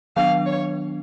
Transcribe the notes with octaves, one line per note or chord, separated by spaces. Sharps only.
D#3 F#3 B3 D4 F5
C#5